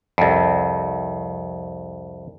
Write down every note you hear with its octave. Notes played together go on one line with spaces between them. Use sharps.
C2 F2